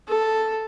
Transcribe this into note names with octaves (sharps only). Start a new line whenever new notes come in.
A4